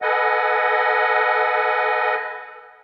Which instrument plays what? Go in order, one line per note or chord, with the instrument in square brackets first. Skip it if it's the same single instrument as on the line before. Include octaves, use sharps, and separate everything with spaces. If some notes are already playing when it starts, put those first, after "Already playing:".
[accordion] A4 B4 D#5 F#5 G#5